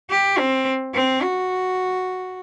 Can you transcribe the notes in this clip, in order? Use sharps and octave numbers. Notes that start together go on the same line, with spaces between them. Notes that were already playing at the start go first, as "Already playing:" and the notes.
G4
C4
C4
F#4